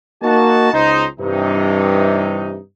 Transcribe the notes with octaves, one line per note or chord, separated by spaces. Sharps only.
A#3 D#4 F#4 A5
C#2 D#4 C5
G2 C3 E3 D#4